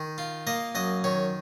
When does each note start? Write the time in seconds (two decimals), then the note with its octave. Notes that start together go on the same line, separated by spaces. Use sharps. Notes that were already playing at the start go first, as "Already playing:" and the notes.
Already playing: D#3
0.18 F4
0.47 A#3 D#5
0.75 F#2 D#5
1.04 D#3 C#5